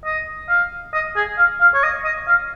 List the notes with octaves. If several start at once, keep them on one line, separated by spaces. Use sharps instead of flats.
D#5
F5
D#5
G#4
F5
F5
C#5
D#5
D#5
F5